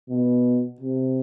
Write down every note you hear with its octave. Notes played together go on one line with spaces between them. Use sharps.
B2
C3